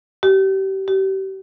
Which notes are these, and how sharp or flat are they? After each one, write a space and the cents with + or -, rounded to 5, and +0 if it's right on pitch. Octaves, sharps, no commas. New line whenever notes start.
G4 -30
G4 -35